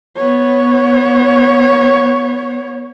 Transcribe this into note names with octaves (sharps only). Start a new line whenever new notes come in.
B3 C#5